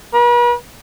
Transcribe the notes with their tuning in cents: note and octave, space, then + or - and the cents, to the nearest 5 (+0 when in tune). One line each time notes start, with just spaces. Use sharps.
B4 -45